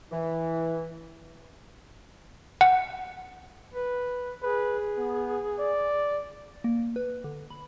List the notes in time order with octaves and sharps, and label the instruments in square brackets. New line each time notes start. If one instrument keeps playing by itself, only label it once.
[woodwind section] E3
[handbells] F#5
[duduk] B4
[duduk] G#4 [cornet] B4
[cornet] B3
D5
[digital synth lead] A#3
B4
D3
B5